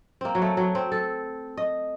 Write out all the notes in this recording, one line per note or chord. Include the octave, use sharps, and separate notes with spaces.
A#3 C4
F#3
A3
F#3
C4
A4
D#5